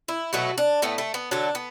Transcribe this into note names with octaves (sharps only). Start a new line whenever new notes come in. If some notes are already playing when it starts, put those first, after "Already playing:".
E4
B2 F#3 A3 F#4
D4
A2 A3 B3
A3
B3
D3 F#3 A3 D4
B3